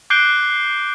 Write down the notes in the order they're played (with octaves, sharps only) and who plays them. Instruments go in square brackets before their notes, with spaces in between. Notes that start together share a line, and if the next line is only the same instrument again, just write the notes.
[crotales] D6 F#6 G6 C7 D7 G7